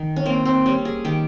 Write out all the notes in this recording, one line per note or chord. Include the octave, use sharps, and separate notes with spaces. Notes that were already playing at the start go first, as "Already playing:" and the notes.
Already playing: D#3
C#4
A#3 C4
C4
G3 C#4
G#4
D#3 G4